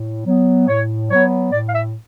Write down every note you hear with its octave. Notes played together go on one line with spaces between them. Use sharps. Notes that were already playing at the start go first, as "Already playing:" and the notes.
Already playing: A2
F#3 B3
A2 C#5
F#3 B3 C#5
A2 D5
F5
E5